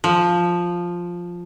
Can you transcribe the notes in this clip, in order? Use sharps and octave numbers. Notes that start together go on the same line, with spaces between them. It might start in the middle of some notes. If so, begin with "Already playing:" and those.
F3